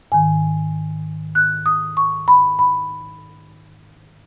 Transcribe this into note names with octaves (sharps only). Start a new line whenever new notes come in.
G#2 D#3 G#5
F#6
D#6
C#6
B5
B5